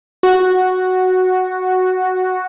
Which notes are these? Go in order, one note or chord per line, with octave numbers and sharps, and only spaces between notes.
F#4